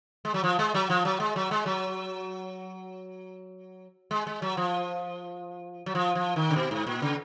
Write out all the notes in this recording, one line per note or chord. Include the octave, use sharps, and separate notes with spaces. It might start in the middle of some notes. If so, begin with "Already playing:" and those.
G#3
F#3
F3
G#3
F#3
F3
F#3
G#3
F#3
G#3
F#3
G#3
G#3
F#3
F3
F#3
F3
F3
D#3
C#3
B2
G#2
A#2
C#3